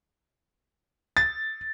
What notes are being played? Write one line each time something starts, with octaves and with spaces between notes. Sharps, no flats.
A6